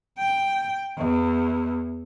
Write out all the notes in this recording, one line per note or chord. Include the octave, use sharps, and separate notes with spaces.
G5
E2